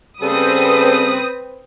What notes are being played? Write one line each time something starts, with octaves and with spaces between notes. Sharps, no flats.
C#3 G3 C4 A4 B4 D#6